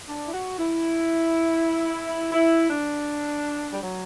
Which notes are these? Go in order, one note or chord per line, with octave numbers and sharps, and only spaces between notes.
D4
E4
F#4
E4
E4
D4
G3
F#3